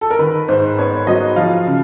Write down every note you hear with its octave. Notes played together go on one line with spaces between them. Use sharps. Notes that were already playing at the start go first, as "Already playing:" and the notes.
A4
A#4
D#3 B4
G#2 C5
B3 C#5
F#3 D#5
F3 F5
C#3